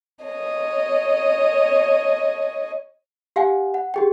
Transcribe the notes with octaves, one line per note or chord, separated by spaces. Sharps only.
C#5 D#5
G4 F5 F#5 G#5
F#5
G4 G#4 G5